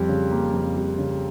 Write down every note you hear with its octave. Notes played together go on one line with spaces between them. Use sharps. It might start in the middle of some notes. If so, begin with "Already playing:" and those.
Already playing: F2 G3
C#3
A#3
F2
G3
C#3